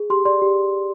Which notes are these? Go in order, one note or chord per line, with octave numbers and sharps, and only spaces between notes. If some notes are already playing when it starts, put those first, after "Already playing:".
Already playing: G#4
G4 C6
D5 C6
G4